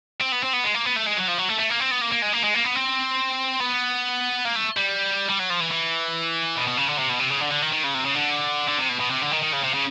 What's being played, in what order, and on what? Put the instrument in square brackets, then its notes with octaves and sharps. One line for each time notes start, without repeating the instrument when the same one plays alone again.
[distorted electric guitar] C4
B3
C4
B3
G#3
A#3
B3
A3
G#3
F#3
F3
F#3
A3
A3
A#3
C4
B3
A#3
A#3
G#3
A#3
G#3
A#3
B3
C4
B3
A#3
A3
G3
G3
F#3
F3
E3
E3
B2
B2
C#3
D3
C3
B2
C3
C#3
D3
D3
D#3
D#3
C#3
C3
C#3
D3
D3
C3
B2
B2
C3
D3
D#3
D#3
C#3
C3
C#3